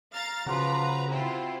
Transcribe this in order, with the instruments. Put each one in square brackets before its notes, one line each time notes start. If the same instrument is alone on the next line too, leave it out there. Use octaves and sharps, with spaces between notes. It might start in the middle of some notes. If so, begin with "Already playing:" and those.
[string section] F5 A#5 A6
[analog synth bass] C#3 [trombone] F3 [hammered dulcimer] F#4 D5 C6 [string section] B4 A#5
[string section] C3 E4 F4 [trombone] C4